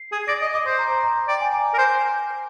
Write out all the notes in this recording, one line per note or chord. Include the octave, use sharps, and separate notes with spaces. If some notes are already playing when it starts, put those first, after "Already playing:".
Already playing: C7
G#4
D5 A#6
D#5 A#6
D#5 D6
C5 C6
A#5
A#5
A#5
A#5
D5 G5
G#5
A#5
D6
A#4
C5 G#5